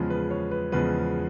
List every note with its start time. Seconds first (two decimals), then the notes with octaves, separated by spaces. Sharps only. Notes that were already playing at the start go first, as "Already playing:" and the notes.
Already playing: E2 C#3 F3 G#3
0.10 B4
0.31 C#5
0.51 B4
0.72 E2 C#3 F3 G#3 B4